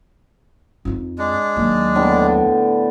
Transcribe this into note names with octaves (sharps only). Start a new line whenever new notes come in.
F2 D#4
G#3 D4
D#2 F#3
A2 D3 B3